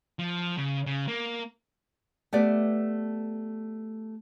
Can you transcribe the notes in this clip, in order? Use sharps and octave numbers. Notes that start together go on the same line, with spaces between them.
F3
C#3
C#3
A#3
A3 B3 G4 D5